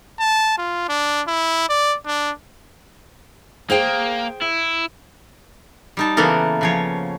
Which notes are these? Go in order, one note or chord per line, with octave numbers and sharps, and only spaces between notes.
A5
F4
D4
E4
D5
D4
A#3 G#4 C5 G5
E4
G3 D#4 A5
C#3 E3 A#3 B3 A4 A#4
C#3 F3 C#5